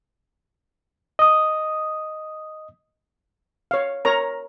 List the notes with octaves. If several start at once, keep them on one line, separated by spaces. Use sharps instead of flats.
D#5 D#6
C#5 F5
A#4 C#5 A#5